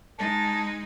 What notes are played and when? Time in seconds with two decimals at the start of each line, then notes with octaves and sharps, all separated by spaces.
0.19 G#3 D#4 A5